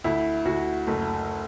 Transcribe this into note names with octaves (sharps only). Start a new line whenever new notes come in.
D2 E4
D2 F#4
F#1 A3